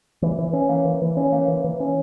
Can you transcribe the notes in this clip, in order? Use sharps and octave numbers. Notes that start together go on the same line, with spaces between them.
E3
E3
C#4
A#3
E3
E3
C#4
A#3
E3
E3
C#4